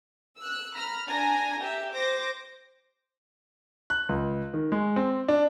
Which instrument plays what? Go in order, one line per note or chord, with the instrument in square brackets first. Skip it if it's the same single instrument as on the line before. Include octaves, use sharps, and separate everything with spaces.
[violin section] E6 F#6
A#5 B5 F6
D4 G#5 A#5 A#6
G4 E5
C5 D6 A#6
[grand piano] F#6
C#2
D#3
G#3
C4
D4